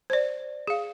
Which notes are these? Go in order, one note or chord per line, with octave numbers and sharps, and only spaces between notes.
C5 D5
G#4 F5